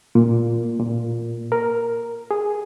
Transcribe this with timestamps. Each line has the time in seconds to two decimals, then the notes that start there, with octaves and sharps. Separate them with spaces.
0.15 A#2
0.80 A#2
1.52 A#4
2.31 G#4